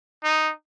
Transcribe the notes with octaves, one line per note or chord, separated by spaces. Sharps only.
D#4